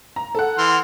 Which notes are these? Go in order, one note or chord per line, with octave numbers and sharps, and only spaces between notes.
A#5
A4 F#5
E3 C6 F6